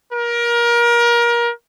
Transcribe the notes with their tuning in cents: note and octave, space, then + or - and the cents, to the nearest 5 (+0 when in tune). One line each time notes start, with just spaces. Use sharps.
A#4 +25